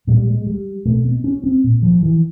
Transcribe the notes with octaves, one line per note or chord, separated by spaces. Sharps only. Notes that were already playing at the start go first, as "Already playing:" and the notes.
A#2 G3
G#3
G3
B2 A3
B3
C#4
C4
A#2
F3
E3